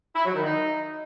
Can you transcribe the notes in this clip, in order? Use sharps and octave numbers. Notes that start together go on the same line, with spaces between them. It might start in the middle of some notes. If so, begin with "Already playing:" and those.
E4
F#3
D#3
D#4